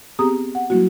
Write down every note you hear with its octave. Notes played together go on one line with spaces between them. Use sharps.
B3 C4 G4 G#4 A#5 D#6
F#5
F#3 G3 A#3 E4 F#4